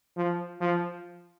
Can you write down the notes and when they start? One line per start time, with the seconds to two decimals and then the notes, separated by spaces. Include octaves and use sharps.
0.17 F3
0.61 F3